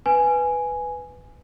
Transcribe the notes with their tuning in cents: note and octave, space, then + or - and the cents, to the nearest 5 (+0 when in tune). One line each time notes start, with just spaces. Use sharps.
B4 +5 G#5 +0